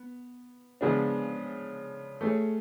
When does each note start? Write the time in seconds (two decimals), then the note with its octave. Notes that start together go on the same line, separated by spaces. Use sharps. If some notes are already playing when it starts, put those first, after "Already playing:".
Already playing: B3
0.81 C#3 F3 G#3 B3 D4
2.21 A3 C#4 G#4 C#5